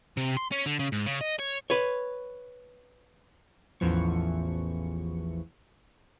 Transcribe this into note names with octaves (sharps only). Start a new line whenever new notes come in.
C3
C6
C#4
D3
C#3
G#2
C#3
D#5
C#5
B4 C#5
A1 E2 E3 F3 C#6